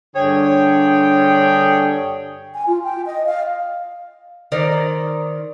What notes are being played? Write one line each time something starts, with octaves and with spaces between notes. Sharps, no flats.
G2 D3 G#4 C#5 G5
G#5
F4
G5
D#5
F5
D#3 A#4 C5 D5